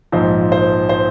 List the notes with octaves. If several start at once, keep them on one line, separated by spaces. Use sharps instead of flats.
A#1 G#2 F3 C5
C5
C5